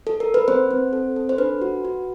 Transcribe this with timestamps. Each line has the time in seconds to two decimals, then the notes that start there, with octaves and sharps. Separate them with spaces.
0.07 A4
0.20 A#4
0.34 B4
0.48 C4 C5
0.71 C4
0.93 A4
1.16 A4
1.29 C5
1.38 D4 B4
1.61 F#4
1.85 F#4